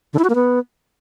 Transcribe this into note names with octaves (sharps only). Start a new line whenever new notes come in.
D3
E4
F#4
A#3
B3